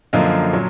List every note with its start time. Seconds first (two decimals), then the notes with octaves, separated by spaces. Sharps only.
0.13 F#2 D3 F3 A#3 D#5 F5
0.53 A#2 F#3